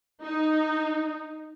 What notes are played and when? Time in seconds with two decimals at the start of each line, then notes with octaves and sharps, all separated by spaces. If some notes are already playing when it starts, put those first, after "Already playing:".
0.22 D#4